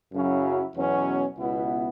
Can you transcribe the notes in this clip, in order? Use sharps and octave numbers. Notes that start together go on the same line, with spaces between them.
F#2 C#3 F#3 C#4 E4
E2 B2 F#3 C#4
C#2 B2 B3 E4